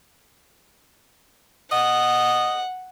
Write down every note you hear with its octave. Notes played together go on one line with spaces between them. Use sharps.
D#5 F#5